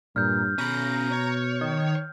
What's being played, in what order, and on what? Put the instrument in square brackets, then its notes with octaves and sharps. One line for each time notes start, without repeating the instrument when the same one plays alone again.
[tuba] G2 [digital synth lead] A#2 [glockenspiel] F6 G6
[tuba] B2 [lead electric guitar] C#4 B5 [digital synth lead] A#5
[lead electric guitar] C#5
[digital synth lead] D#3